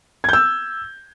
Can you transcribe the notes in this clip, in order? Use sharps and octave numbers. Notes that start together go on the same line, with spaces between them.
E6 G6 G#6